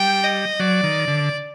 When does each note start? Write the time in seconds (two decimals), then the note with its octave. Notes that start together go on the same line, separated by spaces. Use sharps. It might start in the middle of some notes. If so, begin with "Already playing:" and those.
Already playing: G3 G5
0.23 D#5
0.60 F#3 D5
0.83 D#3
1.08 D3